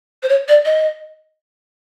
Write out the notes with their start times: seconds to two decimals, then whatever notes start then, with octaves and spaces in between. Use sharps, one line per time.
0.23 C5
0.29 C#5
0.48 D5
0.65 D#5